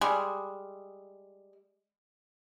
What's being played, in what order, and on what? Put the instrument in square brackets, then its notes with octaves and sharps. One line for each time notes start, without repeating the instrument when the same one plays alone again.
[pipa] G3 G#3